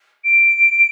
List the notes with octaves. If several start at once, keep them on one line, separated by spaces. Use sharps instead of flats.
D7